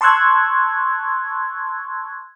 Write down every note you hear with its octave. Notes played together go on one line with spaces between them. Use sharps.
A5 C6 C#6 E6 F#6 G#6